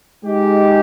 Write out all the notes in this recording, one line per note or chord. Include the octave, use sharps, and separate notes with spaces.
G#3 D#4 G4